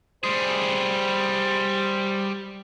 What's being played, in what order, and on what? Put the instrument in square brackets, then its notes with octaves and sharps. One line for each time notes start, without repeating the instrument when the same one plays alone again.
[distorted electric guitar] G3 G#4 [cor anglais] C5